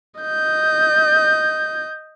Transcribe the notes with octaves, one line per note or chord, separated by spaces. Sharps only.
D#5 G6